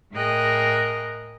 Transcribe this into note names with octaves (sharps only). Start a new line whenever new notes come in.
A2 G#4 A#4 D#5 G5 F#6